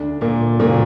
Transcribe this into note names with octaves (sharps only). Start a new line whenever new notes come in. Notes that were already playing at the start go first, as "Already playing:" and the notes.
Already playing: D2 D3 D4
A#2 A#3
F#1 A#2 D#3 A#3